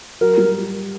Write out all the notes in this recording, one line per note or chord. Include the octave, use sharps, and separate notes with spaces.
F#3 A#4
G3